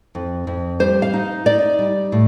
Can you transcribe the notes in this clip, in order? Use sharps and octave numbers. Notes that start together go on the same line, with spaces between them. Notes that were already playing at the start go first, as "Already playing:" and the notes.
F2
F2
G3 C5
F5
D#4
D#4 D5
G3
A2